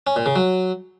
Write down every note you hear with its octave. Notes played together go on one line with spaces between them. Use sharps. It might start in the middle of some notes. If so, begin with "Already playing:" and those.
C#4
A#2
C#3
F#3